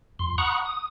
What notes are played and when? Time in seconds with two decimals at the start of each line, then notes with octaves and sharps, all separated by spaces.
0.19 F2 C6
0.38 F#5 A#5 B5 C#6 D#6 F#6
0.66 D#6